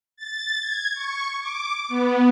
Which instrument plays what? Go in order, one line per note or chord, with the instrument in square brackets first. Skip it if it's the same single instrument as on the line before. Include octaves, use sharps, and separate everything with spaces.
[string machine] A6
G#6
C#6
D6
B3